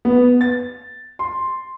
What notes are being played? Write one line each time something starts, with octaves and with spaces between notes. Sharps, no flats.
B3
A6
C6